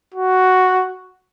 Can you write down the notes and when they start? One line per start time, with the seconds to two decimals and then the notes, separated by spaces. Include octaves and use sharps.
0.14 F#4